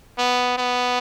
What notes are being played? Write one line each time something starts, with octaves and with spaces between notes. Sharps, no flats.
B3
B3